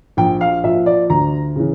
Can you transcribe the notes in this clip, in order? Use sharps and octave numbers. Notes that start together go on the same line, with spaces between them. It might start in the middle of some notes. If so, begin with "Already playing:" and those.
A#1 G5
F5
A#2 F3 E5
D5
D2 A#5
C#3 E3